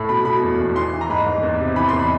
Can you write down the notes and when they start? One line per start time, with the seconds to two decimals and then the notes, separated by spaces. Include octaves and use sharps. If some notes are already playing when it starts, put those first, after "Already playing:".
Already playing: A2
0.09 B2 B5
0.25 B2 B5
0.43 E2
0.59 E2
0.76 E3 C6
0.93 E3
1.01 A#5
1.10 G#2 B5
1.26 G#2
1.43 E2
1.60 C3
1.76 E3 B5
1.89 E2 C6
1.99 B5